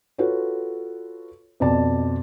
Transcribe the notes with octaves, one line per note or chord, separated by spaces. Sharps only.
F4 F#4 A4 B4 C#5
F2 B2 D5 A5